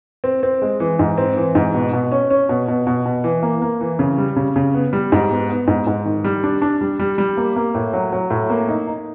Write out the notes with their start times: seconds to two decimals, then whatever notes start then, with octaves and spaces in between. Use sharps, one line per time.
0.24 C4
0.43 C4
0.62 G#3
0.80 E3
0.99 G#2
1.18 C4
1.37 E3
1.55 G#2
1.74 B2
1.93 B2
2.12 C#4
2.30 C#4
2.49 B2
2.68 B2
2.87 B2
3.05 B2
3.24 E3
3.43 A#3
3.62 A#3
3.81 E3
3.99 C#3
4.18 G3
4.36 C#3
4.56 C#3
4.74 B3
4.93 G3
5.12 G#2
5.30 B3
5.50 B3
5.68 G#2
5.87 G#2
6.05 D#3
6.24 G3
6.44 D4
6.62 D4
6.81 G3
7.00 G3
7.18 G3
7.37 A#3
7.56 A#3
7.75 A2
7.93 F#3
8.13 F#3
8.30 A2
8.50 A#3
8.69 D#4
8.87 D#4